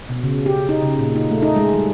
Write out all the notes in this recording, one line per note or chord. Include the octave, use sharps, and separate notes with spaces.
B2
C#3
G4
D#4
C#3
A#2
D#4
A3
D#4
G#3
G3